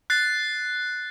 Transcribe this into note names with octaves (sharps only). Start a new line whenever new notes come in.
F#6 A6 C7